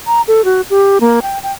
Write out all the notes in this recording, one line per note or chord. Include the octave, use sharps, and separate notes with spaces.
A#5
A4
F#4
G4
A#3
G5
G5